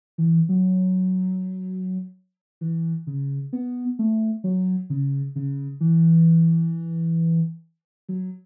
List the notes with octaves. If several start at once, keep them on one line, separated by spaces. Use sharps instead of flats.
E3
F#3
E3
C#3
B3
A3
F#3
C#3
C#3
E3
F#3